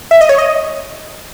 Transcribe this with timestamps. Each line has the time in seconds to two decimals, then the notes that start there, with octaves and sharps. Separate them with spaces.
0.11 E5
0.21 D#5
0.29 C#5
0.39 D#5